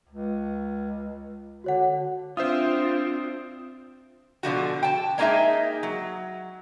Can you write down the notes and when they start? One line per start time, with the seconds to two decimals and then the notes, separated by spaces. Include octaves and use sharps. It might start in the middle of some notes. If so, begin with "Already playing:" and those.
0.09 C#2
1.64 D3 F#4 C#5 F#5
2.37 C4 D4 F4 C5 E5 D#6
4.43 B2 D3 F3 F#4
4.83 G5 A5
5.18 G#3 A#3 D4 D#4 G#4 E5
5.83 F#3